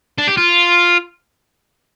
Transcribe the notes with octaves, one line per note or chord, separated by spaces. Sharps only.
D4
G4
F4